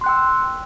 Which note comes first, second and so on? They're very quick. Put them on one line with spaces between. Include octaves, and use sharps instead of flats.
C6 F#6 G5 E6